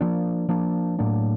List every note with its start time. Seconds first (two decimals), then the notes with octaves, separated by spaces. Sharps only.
0.01 F3 A#3 D4
0.49 F3 A#3 D4
0.99 A2 F#3 A#3 D4